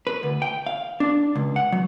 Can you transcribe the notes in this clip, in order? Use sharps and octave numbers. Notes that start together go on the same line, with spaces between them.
B4
D2
G5
F5
D4
C#2
F#5
F#3